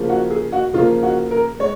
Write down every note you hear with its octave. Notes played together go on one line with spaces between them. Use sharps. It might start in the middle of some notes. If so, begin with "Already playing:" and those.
Already playing: C#3 F3 A#3
F#4
G#4
F#4
C#3 F3 A#3 F4
F#4
A#4
G#3 C#5